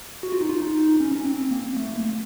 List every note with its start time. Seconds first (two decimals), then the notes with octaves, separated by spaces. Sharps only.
0.23 F#4
0.32 F4
0.41 D#4
0.49 F4
0.62 D#4
1.00 C#4
1.15 C#4
1.26 C4
1.51 A#3
1.77 A3
1.96 A#3